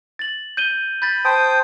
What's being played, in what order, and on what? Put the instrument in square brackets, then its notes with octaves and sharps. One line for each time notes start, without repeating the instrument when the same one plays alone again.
[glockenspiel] A6 F#7
G6 D#7 G7
[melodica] B5 [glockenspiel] G6 A6
[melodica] C5 G5 D#6 [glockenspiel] A5